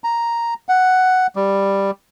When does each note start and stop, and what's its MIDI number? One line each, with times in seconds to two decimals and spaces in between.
0.04 0.54 82
0.69 1.27 78
1.36 1.91 55